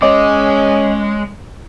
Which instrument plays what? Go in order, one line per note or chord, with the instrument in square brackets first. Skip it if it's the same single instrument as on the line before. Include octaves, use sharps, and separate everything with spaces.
[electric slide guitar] G#3 [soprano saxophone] C#4 [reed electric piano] C#5 D#5 D6